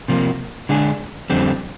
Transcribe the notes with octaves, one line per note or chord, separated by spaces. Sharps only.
C3 F3 A#3
D3 G#3 D4 G#4
F2 D3 G3 C4